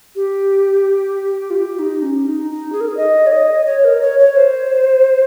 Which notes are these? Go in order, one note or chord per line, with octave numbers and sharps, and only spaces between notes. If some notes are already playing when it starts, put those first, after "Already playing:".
G4
F4
G4
D#4
C#4
D#4
D#4
G#4
A#4
G#4
D#5
C#5
D#5
C#5
A#4
C#5
C#5
C5